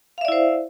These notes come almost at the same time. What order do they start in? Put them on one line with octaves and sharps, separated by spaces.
F5 E5 D5 E4 C5